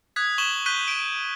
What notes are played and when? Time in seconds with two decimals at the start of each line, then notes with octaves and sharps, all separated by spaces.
0.16 D#6 F#6 G#6 B6
0.38 C#6 E7 F#7 G7
0.66 C#6 F#6 G6 B6 D#7 G7
0.88 D7 D#7